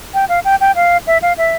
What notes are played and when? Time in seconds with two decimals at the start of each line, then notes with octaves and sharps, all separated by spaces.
0.14 G5
0.29 F5
0.45 G5
0.61 G5
0.76 F5
1.07 E5
1.22 F5
1.38 E5